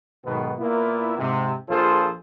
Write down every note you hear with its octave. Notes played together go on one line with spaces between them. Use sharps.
B1 G#2 B2 D#3 B3
A#2 A#3 B3 E4
G#2 C3
A#1 F3 F4 G#4 A4 C5